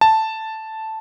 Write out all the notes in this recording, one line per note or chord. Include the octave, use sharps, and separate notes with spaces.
A5